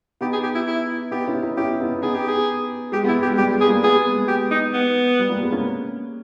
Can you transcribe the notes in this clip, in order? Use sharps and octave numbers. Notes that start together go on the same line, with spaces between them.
B3 D#4 G4
G#4
G4
E4
E4
B3 D#4 G4
C#4 E4
B3 D#4
C#4 E4 G4
B3 D#4
B3 D#4 G#4
G4
G#4
G#3 G4
G#3 B3 E4
G4
G#3
G3 G4
G#3
G#4
G3 A#3
G#3 B3 G#4
G#3
G4
D#4
B3
G3
G3 A#3
G#3 B3
A#3 C#4